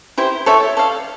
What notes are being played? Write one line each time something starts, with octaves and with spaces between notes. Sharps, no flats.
E4 G4 C5
A4 C#5 E5 G5
A4 D5 F5